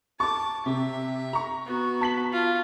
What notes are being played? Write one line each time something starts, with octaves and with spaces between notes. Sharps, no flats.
A5 C#6 D6
C3 E5
A#5 C#6
B3 F#4
A5 B6 F#7
F4